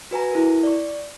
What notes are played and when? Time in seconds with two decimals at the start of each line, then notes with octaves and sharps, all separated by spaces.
0.11 F#4 B4 G#5 A#5
0.31 E4 A#4
0.63 D5 C#6